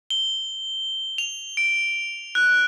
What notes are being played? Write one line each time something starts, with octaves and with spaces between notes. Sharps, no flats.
G7
F7
D7
F#6